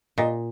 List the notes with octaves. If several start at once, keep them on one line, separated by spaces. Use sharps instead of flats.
A#2 D#5